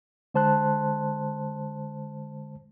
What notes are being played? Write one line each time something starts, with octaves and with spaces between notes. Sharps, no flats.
D3 G#3 C5 A5 C6 F#6